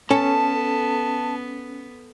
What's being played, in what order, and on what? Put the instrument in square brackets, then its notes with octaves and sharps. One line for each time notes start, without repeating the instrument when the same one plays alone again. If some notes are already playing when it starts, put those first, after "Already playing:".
[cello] B3 [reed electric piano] C#4 [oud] A4 [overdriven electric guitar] A5